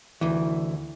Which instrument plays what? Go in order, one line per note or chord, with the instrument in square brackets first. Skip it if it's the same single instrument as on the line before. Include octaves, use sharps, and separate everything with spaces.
[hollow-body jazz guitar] D2 E3